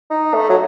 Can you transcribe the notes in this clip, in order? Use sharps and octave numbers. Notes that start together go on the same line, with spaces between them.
D#4
A3
F#3